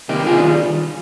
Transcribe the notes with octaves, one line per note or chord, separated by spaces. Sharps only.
C3 D#3 A#3 D#4 G4
C3 F4 G#4
D4 F4
D#3 G3